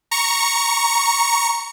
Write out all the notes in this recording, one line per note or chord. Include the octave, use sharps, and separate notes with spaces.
A#5 C#6 C#7